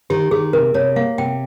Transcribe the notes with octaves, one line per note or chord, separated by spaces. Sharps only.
D#3 G4
D#3 G#4
C3 A#4
C3 C#5
A#3 F5
C3 G5